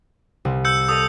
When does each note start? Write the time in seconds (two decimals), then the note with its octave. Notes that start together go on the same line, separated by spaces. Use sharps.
0.45 C2 C3
0.65 E6 G6 C#7
0.89 A4 D#5 D#6